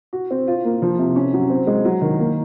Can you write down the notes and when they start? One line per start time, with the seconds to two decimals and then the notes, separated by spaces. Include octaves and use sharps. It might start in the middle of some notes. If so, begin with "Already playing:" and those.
0.13 F#4
0.31 C4
0.47 F4
0.65 A#3
0.82 F3
0.99 C3
1.16 C#4
1.33 F#3
1.50 C4
1.67 G#3
1.85 F#3
2.01 D#3
2.20 A#3